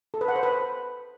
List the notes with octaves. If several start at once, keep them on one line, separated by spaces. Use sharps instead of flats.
A4
B4
F#5
C5
B4